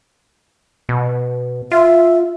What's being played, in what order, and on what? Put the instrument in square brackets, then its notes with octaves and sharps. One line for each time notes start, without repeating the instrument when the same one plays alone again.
[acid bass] B2
[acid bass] F4 [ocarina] E5